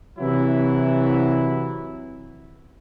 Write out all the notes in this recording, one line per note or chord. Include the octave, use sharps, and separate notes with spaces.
C3 E3 F#3 E4